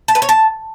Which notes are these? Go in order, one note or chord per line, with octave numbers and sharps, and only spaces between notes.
A5
B4
C#5
A5